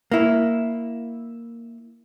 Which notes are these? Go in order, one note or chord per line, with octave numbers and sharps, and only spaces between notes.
A#3 E4